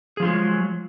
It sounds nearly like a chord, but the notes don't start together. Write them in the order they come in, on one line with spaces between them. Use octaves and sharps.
G#4 F3 F4 F#3 G#3